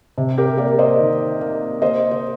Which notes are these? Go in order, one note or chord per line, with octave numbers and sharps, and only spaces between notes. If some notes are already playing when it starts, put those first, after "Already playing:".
C3
G4 A#4
A#3 A#4 D5
C5 D#5
D#3
A#3
A#3 C5 D#5
C5